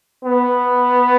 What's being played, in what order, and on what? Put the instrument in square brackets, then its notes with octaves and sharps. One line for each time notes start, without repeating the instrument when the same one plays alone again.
[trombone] B3